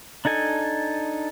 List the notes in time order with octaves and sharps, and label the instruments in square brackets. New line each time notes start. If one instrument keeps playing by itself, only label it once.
[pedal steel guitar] D4 D#4 A4 G#5